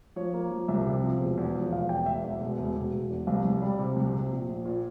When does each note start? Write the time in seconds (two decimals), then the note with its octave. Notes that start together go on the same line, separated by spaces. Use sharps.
0.16 F3 C#5
0.34 A#3
0.51 F3
0.68 C2 E5
0.86 C3
1.03 F3
1.20 E1
1.37 E2
1.55 F3
1.72 E1 F5
1.89 E2 G5
2.06 E1 E5
2.23 E2 E5
2.41 E1
2.58 E1
2.76 E1
2.93 E1
3.10 E2
3.27 C2 F5
3.45 C2
3.62 G3
3.79 C3
3.96 C2
4.14 C3
4.32 A#1
4.48 A#1
4.65 A#2